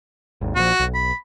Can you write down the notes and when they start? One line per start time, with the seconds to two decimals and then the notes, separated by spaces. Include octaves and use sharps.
0.41 G#1 D#2
0.56 A#1 F3 F#4
0.80 B1
0.94 B5